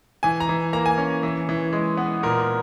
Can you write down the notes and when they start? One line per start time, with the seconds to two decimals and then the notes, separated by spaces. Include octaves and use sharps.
0.23 E3 G#5
0.40 A#5
0.49 E3
0.73 A#3 A#5
0.86 G#5
0.98 C#4
1.23 E3
1.49 E3
1.72 G#3
1.97 B3
2.23 A#2 A#4